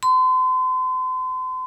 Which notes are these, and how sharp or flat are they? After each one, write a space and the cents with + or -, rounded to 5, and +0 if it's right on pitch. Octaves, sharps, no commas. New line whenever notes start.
C6 -40